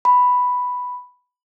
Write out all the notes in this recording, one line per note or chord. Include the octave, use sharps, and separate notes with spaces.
B5